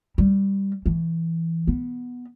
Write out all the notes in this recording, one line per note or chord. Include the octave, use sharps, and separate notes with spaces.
G3
E3
B3